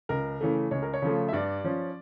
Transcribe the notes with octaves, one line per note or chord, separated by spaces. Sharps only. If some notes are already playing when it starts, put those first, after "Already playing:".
C#2 A#4
C#3 E3 A3
C#2 C#5
A#4
C#5
C#3 F3 A3
E5
G2 D5
F3 C#4